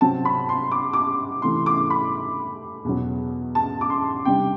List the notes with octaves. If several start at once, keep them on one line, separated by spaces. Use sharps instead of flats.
C3 F#3 C4 A5
B5
C6
D6
D6
C3 E3 A3 C6
D6
B5
E2 B2 F#3
A5
D6
C6
C3 G3 D4 G5